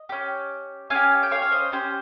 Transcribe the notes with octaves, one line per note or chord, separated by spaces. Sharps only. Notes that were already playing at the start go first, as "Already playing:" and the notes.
Already playing: D#5
C#4 G4
C#4 G4 F5 G#5
G5
C#5 F5
C#5
C5 D#5
C#4 G4 C5